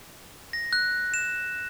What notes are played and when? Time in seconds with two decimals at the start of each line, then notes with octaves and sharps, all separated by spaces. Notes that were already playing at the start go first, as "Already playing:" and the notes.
0.53 A#6
0.73 F#6
1.14 E7